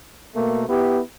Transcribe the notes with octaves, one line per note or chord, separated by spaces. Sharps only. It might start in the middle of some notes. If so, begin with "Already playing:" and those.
B2 A3 A#3
B3 E4 G4